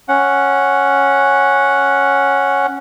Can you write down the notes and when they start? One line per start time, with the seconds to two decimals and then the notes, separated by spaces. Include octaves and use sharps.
0.09 C#4 F#5